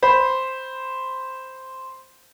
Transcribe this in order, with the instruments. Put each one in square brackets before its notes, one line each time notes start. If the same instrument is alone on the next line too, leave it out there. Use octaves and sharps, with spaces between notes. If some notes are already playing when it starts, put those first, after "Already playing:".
[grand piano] C5 B5 C6